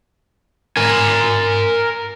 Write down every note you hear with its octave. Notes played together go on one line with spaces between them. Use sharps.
A#4 G#5